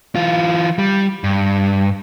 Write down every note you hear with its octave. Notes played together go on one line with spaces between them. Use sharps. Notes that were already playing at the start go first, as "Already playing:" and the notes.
E3 F4
G3
G2